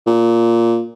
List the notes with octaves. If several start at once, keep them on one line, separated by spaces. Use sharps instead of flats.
A#2